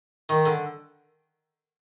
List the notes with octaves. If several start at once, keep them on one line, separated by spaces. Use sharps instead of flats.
D#3
D3